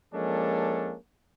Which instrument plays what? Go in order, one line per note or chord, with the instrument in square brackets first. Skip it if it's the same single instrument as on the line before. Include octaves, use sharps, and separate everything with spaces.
[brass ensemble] F3 G#3 A#3 C#4 D4 A4